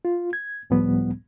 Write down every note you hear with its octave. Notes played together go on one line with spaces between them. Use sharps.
F4
G#6
C#2 A2 F3 G3 B3